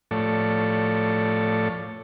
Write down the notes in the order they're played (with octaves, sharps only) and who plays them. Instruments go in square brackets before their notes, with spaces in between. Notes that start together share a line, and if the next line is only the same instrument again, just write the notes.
[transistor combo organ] A2 F3 A3 A4 C#5 D5